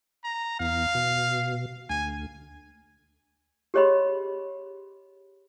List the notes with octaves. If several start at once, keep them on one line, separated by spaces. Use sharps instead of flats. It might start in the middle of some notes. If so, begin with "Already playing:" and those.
A#5
E2 F5
B2
D2 G#5
G4 G#4 C#5 D#5 B5 C6